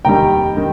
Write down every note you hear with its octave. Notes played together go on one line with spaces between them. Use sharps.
F1 D#2 D#3 G3 G5 A#5
D#3